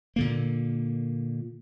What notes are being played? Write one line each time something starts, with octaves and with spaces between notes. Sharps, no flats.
A#2 D3 A#3